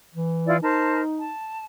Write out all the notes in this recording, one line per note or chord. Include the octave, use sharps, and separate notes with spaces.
E3
E4 F4 D5
D#4 A#4 C5 A5
A5